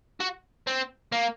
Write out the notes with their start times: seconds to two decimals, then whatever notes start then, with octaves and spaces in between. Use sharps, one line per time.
0.21 F#4
0.67 C4
1.12 A#3